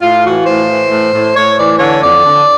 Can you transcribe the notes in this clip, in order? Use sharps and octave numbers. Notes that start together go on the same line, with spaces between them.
A2 F4
E3 F#4
A2 C5
E3
A2
A2
A2 C#5
E3 D5
D3 C#5
F2 D5
D3